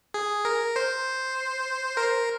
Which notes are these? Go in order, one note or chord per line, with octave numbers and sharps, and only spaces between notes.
G#4
A#4
C5
A#4